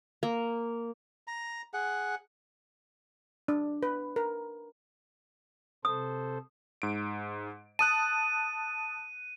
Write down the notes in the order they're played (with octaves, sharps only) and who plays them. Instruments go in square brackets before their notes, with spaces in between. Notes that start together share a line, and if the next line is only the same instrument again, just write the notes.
[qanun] A#3
[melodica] A#5
G#4 F#5
[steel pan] D4
B4
A#4
[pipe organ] C3 A4 C5 [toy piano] D#6
[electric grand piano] G#2 D7
[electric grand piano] A5 D#6 F#6 [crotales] D#7